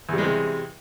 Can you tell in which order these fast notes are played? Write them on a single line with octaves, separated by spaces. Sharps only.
E2 G3 G#3 C3